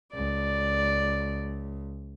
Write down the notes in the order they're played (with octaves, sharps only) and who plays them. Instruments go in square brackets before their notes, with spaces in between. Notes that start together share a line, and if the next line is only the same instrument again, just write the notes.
[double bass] C#2 [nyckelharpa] D5